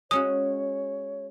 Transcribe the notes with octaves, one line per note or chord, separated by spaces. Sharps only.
G#3 C#4 F#4 C#5 D#6